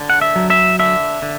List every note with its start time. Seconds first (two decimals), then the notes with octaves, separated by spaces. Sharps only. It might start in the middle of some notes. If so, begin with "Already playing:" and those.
Already playing: D3
0.10 F#5
0.21 E5
0.36 F#3
0.50 E5
0.79 D3 E5
1.22 D3